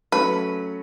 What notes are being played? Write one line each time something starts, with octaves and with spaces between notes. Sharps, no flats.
F#3 A3 C#4 B4